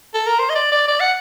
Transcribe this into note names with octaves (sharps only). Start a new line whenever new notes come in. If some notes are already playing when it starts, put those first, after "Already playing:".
A4
A#4
C5
D#5
D5
D5
D5
F#5